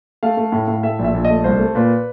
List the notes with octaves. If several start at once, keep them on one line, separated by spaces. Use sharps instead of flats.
A3 F5
A3
A2
A2
A3 E5
A#1
E5
A#1
D#5
A3
C2 C5
A3
A#2 B4